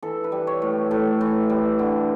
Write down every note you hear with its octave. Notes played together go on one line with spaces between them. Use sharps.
E3 A4
B4
G3
C#5
A2
A2 A4
E3
G3
D3